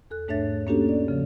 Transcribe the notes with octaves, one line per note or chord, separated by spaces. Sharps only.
E2 A4 F#6
G#2 A3 D4 C#5 E5 A6
A#3 C#4 D4 F#4 G4 A4
D5
C#3 F3